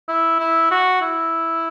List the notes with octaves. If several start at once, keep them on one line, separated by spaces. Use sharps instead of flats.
E4
E4
F#4
E4